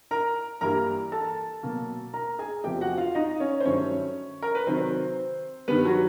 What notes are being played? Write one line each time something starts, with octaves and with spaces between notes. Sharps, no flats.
A#4 A#5
G2 E3 G3 A#3 A#4 A#5
A4 A5
B2 F#3 A#3
A#4 A#5
G#4 G#5
E2 C3 F3 A3 G4 G5
F#4 F#5
F4 F5
D#4 D#5
C#4 C#5
C5
G2 D#3 F#3 A3 C#4 C#5
A#4
B4
C3 D#3 F#3 C4 C5
G2 D#3 G3 B3 B4
F#3 F#4